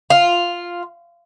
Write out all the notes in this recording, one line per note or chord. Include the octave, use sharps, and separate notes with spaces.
F4